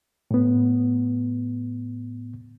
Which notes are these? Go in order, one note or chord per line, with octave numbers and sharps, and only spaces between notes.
A2 B3